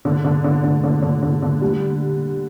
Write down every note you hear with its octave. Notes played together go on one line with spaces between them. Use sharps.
D3
D3
D3
D3
D3
D3
D3
D3
G3